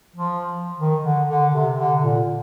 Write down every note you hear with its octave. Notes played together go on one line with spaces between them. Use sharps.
F3
D#3
D3
D3
C3
D3
A#2